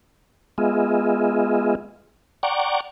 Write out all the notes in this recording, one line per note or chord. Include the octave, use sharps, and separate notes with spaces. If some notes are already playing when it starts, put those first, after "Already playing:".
G#3 B3 F4 G#4 D#5 E5
D5 F#5 G5 A#5 C#6 D6